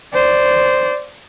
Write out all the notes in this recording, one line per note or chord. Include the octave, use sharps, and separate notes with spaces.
C5 D5